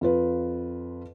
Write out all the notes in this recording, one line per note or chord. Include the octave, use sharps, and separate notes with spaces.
F2 F4 B4